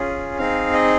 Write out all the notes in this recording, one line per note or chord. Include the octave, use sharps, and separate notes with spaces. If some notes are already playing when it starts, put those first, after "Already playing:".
Already playing: C#4 F4 G#4
C4 D#4 G#4 F5
D#5